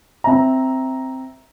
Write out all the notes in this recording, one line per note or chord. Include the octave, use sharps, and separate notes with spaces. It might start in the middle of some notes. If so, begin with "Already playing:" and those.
C4 E5 A#5